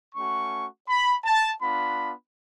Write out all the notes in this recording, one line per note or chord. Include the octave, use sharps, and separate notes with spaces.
A3 C#4 F#4 C#6
B5
A5
B3 D4 F4 B5